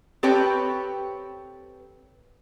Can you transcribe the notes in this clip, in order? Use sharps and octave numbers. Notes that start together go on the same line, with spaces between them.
C4 G4 A4 B4 C#5 G5